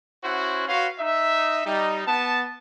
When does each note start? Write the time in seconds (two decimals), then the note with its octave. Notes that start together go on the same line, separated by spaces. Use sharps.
0.24 C#4 E4 F#4 C5 F#5
0.68 F#4 B4 C#5 F5 C6
0.99 D#4 E5
1.66 G3 D#4
2.07 B3 A5